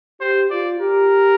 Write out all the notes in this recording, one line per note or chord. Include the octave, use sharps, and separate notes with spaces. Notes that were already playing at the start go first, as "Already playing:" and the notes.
G4 C5
F4 D5
G4 A#4